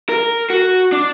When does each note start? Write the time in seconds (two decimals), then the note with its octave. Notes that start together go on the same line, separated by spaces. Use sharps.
0.09 A#4
0.50 F#4
0.92 D4